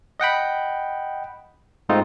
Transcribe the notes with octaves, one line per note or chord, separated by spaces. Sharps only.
D#5 F#5 G5 B5
G#2 A3 C4 D#4 F4